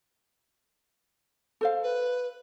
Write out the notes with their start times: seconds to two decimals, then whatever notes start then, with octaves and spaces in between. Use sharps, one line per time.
1.61 A4 C5 F5
1.83 B4